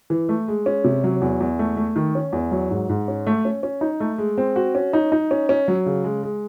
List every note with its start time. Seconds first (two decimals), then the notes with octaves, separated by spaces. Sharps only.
0.10 E3
0.29 A3
0.48 G#3
0.66 C#4
0.84 C3
1.04 F#3
1.21 E2
1.40 E2
1.59 A3
1.77 A3
1.96 D#3
2.15 C#4
2.33 E2
2.51 F#3
2.71 G#2
2.89 G#2
3.08 C#4
3.27 A3
3.45 C#4
3.63 C#4
3.81 D#4
4.00 A3
4.18 G#3
4.38 C4
4.56 F#4
4.75 C#4
4.93 D#4
5.12 D#4
5.31 C#4
5.49 C#4
5.68 F#3
5.86 C#3
6.04 G#3
6.23 G#3